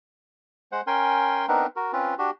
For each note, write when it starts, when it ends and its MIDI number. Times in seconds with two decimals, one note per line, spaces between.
0.72 0.81 56
0.72 0.81 72
0.72 0.81 78
0.87 1.46 61
0.87 1.46 70
0.87 1.46 79
0.87 1.46 80
0.87 1.46 84
1.48 1.66 59
1.48 1.66 60
1.48 1.66 62
1.48 1.66 63
1.48 1.66 70
1.48 1.66 71
1.76 1.92 66
1.76 1.92 70
1.93 2.14 60
1.93 2.14 61
1.93 2.14 65
1.93 2.14 71
2.18 2.30 62
2.18 2.30 66
2.18 2.30 67